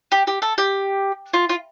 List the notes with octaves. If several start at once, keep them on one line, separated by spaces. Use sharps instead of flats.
G4
G4
A4
G4
F4
F4